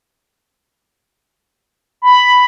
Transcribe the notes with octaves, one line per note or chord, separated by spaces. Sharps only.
B5